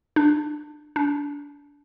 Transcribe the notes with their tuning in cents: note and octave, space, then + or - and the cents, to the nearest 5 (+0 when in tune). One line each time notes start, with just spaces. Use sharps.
D4 +25
D4 -25